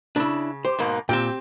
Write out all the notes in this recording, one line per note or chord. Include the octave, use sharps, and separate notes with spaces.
C#3 D4 E4
G4 C5
G#2 B2 A#3
A#2 C4 G4 G5